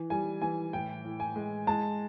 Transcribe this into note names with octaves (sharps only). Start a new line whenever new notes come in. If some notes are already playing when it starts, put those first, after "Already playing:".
Already playing: E3
G3 G#5
E3 G#5
A2 G5
A2
G#5
G#3
G#3 A5